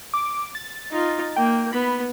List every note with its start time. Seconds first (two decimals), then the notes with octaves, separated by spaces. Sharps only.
0.14 D6
0.55 A6
0.91 D#4 F4
1.36 A#3 G5
1.73 B3 B5